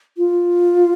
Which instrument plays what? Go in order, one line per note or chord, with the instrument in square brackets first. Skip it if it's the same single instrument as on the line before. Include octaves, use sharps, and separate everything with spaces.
[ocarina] F4